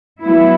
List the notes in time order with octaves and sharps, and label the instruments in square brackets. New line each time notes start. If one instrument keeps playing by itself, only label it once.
[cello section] F#3 B3 E4